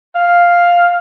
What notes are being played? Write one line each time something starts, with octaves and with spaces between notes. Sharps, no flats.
F5